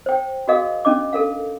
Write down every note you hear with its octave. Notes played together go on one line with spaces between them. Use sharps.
C5 G5
F#4 G#4 A#4 D#5 F5 D#6
C#4 D4 D#5 D6
A4 A#4 F5